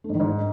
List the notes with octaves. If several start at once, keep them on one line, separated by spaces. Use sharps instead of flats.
A3
G#2
D#3
G#2